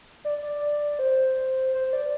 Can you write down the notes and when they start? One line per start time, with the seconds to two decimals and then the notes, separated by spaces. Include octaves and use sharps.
0.25 D5
0.42 D5
0.99 C5
1.74 C5
1.93 D5